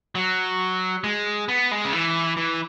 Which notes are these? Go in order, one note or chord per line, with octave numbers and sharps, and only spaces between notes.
F#3
G#3
B3
G#3
C#3
E3
E3